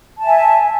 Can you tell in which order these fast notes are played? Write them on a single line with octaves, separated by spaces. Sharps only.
A5 E5 G#5